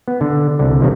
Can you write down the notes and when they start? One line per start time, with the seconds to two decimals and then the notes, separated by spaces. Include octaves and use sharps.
0.08 B3
0.21 D3
0.59 C2 D3
0.81 B1 C3 D#3 F3